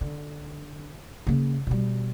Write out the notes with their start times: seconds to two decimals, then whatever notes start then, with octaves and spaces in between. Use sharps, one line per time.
0.01 D3
1.27 C#3 A#3
1.67 B2 G3